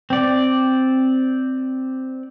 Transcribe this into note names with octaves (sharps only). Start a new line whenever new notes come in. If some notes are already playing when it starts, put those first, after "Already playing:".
C4 D5